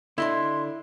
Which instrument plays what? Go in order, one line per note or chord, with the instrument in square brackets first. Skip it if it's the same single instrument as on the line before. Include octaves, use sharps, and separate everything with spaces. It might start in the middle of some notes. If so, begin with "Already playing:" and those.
[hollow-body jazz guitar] D3 D#5 A5 [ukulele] E4 [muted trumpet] C6